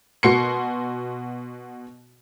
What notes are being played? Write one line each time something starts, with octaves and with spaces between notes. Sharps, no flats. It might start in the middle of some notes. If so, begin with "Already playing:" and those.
B2 F#4 C6 C7 C#7